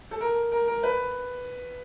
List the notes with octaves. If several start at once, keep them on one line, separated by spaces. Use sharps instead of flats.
A4
A#4
A#4
A#4
B4